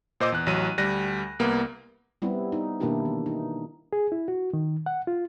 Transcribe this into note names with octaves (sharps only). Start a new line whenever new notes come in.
A#2 C5 D#5 D6 E6
E2 F#6
A1 F#3 D#7
D2 G3 F#6 A#6 D#7
C2 A#3 B3
G3 B3 C4 E4
D#4
B2 D#3 A#3 D4 E4 G4
E3
D#4
G#4
E4
F#4
D#3
F#5
F4